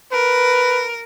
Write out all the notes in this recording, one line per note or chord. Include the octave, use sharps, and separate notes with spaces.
A#4 B4